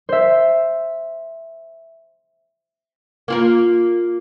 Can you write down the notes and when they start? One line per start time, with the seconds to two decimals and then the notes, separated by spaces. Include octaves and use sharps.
0.09 C5 E5
3.28 A#3 F4 A#4